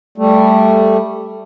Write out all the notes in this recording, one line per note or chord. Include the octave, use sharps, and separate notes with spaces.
G3 A3